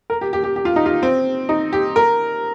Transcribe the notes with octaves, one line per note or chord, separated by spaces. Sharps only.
A#4
G4
G4
G4
G4
F4
D#4
F4
C4
D#4
G4
A#4